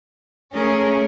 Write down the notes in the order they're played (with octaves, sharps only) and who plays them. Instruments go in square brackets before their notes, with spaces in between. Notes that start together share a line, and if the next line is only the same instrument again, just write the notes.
[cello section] A3 G#4 A#4 [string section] C#4